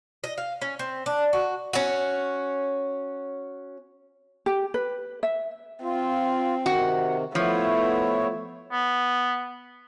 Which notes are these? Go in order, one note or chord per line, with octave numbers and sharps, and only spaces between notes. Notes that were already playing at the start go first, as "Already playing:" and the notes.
D#5
F5
C#4
C4
D4
F#4
C#4 F#4
G4
B4
E5
C4 F4
C3 D#3 F#4
F3 A3 B3 E4 C#5
B3